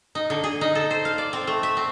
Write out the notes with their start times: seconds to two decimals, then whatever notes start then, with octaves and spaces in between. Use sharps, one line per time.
0.15 D#4
0.30 D3
0.44 G#4
0.61 D#4
0.75 A4
0.90 C5
1.05 F5
1.18 D5
1.33 C4
1.47 A3
1.63 E5
1.77 C4